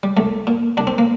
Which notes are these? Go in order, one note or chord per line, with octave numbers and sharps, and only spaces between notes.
G3
C2 A3
A#2
C2 D4
C4
A#3